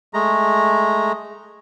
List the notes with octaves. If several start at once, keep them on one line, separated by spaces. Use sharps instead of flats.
G#3 A3 A#5